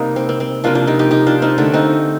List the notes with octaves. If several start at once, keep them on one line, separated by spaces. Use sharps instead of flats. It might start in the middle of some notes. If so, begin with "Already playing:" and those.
Already playing: C3 G3 A#3 D#4
C4
C4
C4
C3 F3 A#3 D4 F4
D4 F4
D#4 G4
D#4 G4
D#4 G4
D4 F4
C4 D#4
D3 A3 D4
C4 D#4